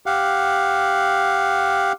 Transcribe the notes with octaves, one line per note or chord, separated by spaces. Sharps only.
G4 F5 F#5